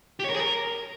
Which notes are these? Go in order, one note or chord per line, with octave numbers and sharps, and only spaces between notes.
G4
C#5
A#4
G#4
A#4